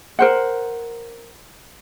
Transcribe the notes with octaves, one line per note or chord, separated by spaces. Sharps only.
A#4 C5 F#5